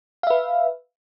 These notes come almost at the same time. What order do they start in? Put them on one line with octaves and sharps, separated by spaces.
F5 E5 B4